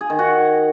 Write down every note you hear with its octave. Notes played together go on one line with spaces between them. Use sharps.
G#4
D#3
F#4